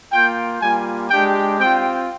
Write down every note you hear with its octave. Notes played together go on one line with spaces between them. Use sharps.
A#3 F4 G5
G3 A#3 F4 G#5
G#3 D4 G4 G5
C4 F4 G5